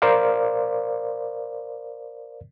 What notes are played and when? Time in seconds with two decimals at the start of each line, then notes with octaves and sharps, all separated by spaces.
0.02 A#4 C5 D5 F5